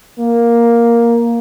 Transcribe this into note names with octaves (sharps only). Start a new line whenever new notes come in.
A#3